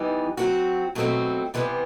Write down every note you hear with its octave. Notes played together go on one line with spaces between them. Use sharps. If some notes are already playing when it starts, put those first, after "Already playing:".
Already playing: E3 G3 B3 D#4
F#3 C4 F#4
B2 F#3 A3 C4 F#4
C3 E3 G3 B3